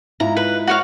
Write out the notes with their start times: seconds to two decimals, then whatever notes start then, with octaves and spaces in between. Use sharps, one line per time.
0.20 G#2 E4 F4 A#5
0.37 B4
0.67 F#4 C#5 F5